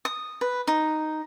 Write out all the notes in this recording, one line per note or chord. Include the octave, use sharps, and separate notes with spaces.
D#6
B4
D#4